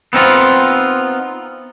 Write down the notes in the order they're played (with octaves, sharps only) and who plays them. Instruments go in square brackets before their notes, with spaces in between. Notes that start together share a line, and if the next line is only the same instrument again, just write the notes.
[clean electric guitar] B3 C4 D#4 F4